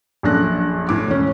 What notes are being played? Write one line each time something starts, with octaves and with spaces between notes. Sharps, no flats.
A#1 F#2 D4 A4 F#6 A#6
A2 D6
E1 C#4